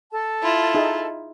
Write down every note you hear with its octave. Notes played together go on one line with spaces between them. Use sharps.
A4 A5
E4 F4
D#4 G#4 E5